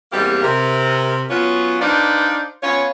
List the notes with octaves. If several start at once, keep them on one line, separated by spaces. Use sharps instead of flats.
E2 G3 G#3 A#3 C4 G4
C3 A#4
F#3 B3 C#4 F4
D4 D#4 B4 C5 D5 F5
B3 C#4 F4 C#5